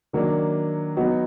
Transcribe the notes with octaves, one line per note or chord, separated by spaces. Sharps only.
D#3 F#3 A#3 D4
F#3 B3 D#4 F#4